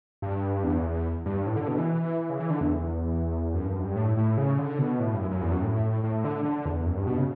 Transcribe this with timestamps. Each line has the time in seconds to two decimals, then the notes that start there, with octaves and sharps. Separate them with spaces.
0.22 G2
0.64 E2
1.26 G2
1.47 A2
1.57 D3
1.68 B2
1.78 E3
2.30 C#3
2.40 E3
2.50 D3
2.61 E2
3.54 F#2
3.65 G2
3.75 F#2
3.85 G2
3.96 A2
4.17 A2
4.37 C#3
4.58 D3
4.79 B2
5.00 A2
5.14 G2
5.20 F#2
5.31 F#2
5.41 E2
5.51 F#2
5.62 A2
6.04 A2
6.24 D3
6.45 D3
6.65 E2
6.86 F#2
6.97 G2
7.07 B2
7.18 C#3